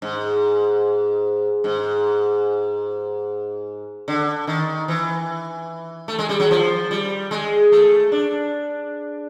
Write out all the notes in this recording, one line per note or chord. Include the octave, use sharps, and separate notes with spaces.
G#2
G#2
D3
D#3
E3
A3
G#3
G3
F#3
F3
G3
G#3
A3
D4